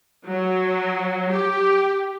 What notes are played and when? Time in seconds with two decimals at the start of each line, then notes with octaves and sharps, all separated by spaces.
0.25 F#3
1.32 G4